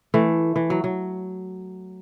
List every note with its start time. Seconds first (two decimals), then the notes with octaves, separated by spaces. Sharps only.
0.14 E3 A3
0.56 E3
0.70 F#3
0.84 F#3